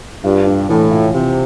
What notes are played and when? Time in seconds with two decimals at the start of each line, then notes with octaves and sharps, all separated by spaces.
0.24 G2 F4
0.46 D4
0.69 A2 E3
0.91 F4
1.14 C3 F4